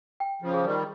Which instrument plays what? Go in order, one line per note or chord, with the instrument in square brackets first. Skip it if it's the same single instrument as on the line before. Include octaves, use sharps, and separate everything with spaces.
[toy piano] G5
[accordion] C#3 F3
[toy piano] G#4
[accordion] D#3 G3